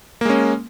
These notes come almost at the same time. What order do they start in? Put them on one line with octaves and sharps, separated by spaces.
A#3 G#3 C#4